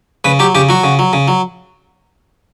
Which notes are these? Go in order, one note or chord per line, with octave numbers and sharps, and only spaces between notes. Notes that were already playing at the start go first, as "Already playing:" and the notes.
C#3 B4
F#3 G4
C#3 G4
F#3 F#4
C#3
F#3
C#3
F#3